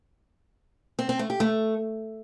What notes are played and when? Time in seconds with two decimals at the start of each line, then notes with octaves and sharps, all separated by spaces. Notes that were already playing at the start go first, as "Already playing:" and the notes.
0.99 C4
1.09 C4
1.19 A3
1.30 G4
1.40 A3